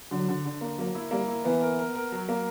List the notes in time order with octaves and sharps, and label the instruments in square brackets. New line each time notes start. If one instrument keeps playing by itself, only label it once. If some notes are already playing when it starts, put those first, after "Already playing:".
[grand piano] D3 [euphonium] F#3
[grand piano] D3
D3
A#3
[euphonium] F#3 [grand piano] A#3
[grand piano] E4
[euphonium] G3 [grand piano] A#3
[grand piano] E4
[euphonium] E3 [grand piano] B3
[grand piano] A#4
A#4
A#4
F#3
A#3